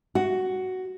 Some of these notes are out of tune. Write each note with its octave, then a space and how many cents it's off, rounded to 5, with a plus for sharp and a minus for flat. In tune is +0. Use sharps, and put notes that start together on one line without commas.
F#4 +10